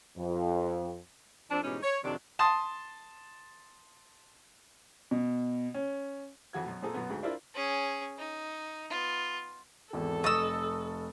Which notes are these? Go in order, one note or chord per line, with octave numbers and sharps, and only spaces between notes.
F2
F2 C4 D4
G#2 B2 E3 G3 C#4 D#4
C#5
F2 C3 D#3 F#3 D4 D5
A5 C6 D#6
B2
C#4
F2 E3 F#4 G#6
F#2 B2
A#2 C4 G#4 A4 A#5
F#2 B2 B3
D2 G#2
D4 E4 F4 A#4 C5 D5
C#4 G#4
D#4
B3 F4
G#1 E2 A4
F1 D#5 C#6 E6 A6